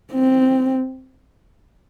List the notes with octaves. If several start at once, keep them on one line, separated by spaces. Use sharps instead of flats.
C4